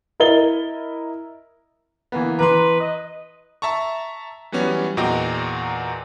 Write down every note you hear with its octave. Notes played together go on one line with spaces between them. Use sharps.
E4 A#4 D#5 A6 G7
E3 A#3 B3
E3 B4 A#5 C6 D6
D#5
E5 A5 A#5 C#6
E3 F#3 G3 B3 C#4
E2 A#2 F#4 D#5 G5 A#5